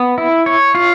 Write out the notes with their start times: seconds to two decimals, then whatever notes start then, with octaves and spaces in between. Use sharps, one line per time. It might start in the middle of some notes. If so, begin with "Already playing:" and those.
Already playing: B3
0.18 E4
0.46 C#5
0.75 F4